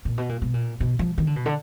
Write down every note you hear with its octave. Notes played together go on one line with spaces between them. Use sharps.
A#2
B2
A#2
B2
A#2
B2
F3
D#3
D3
B2
D3